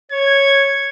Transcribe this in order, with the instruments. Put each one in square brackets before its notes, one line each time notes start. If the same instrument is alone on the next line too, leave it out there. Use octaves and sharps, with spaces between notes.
[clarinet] C#5 [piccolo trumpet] G#6